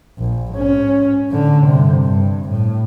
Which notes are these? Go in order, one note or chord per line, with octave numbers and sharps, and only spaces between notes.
A#1
G#2 C#4
A2 D3
G2 C3
G2
A2